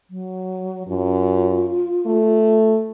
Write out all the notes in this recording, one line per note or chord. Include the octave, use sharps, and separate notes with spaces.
F#3
F#2 F4
A3